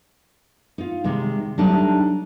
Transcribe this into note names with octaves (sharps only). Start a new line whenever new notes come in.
D#4 F4
C3 D#3 G3 G#3
F#3 G3 A3 D4 D#4